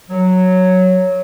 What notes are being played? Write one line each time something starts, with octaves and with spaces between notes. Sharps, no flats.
F#3